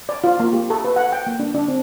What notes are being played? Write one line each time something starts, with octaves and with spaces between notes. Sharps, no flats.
D5
F4
A#3
G4
A4
B4
F#5
G5
A#3
D4
D4
C4